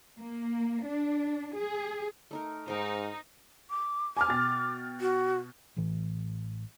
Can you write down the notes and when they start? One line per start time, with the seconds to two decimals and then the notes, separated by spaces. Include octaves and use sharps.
0.20 A#3
0.86 D4
1.56 G#4
2.31 A3 D#4 A#4
2.68 G#2 D#4 A#4 C5
3.70 D6
4.17 G#5 A5 D6 F6
4.28 B2 G5 A6
5.01 F#4
5.76 A1 A2 E3